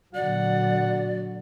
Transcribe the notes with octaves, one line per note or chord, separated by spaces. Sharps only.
A#2 D3 F#3 F#4 D5 F#5